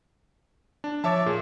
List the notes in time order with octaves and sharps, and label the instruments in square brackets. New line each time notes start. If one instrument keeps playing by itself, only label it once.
[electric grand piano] D4
[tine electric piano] F3 D6 A6 [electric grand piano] C#5 E5 A5
[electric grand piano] A#2 [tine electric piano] G#4